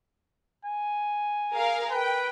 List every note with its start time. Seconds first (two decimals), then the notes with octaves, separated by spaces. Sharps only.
0.65 G#5
1.54 G#4 A#4 F5
1.91 B4 G5